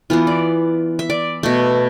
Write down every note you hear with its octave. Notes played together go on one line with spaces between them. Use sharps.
E3 B3 F4
D5
E5
D5
B2 A3